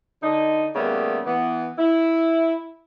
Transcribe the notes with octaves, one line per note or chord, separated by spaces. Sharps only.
D3 D#4
A#2 C#3 G3 A3 B3
E3 B3
E4